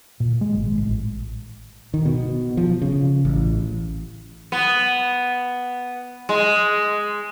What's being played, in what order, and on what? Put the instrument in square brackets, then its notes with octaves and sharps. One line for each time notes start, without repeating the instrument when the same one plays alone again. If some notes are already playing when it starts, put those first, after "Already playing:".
[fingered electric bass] A#2
G#3
G#1
A1
D#3
B2
F3
C#3
A1
[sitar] B3
G#3